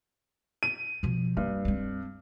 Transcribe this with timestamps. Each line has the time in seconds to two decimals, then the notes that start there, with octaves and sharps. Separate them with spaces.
0.63 D#7
1.03 B2 F3
1.37 G2 A#3
1.65 G#3 C4